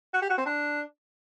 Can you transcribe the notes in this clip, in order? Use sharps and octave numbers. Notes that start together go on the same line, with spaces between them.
F#4
G4
F#4
C4
D4